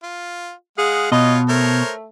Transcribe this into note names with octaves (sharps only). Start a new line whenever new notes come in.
F4
G#3 G#4 F5 F#5
B2 F4 C#5 D#5
A3 A#4 C5 C#5